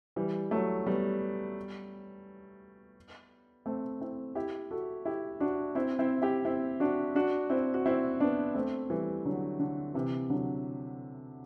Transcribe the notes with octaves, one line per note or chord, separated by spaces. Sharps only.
E3 G3
F#3 A3
G3 B3
A3 C4
C4 E4
E4 G4
F#4 A4
E4 G4
D4 F#4
C4 E4
C4 E4
E4 G4
C4 E4
D4 F#4
D4 F#4
C4 E4
F#4
C4 E4
B3 D4
A3 C4
E3 G3
D3 F#3
D3
C3 E3
D3 F#3